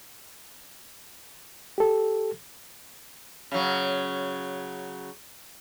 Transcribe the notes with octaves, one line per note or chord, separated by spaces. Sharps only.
G4 A4
C#3 F#3